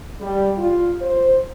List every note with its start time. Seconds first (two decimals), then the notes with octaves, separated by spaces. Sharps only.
0.21 G3
0.58 F4
1.01 C5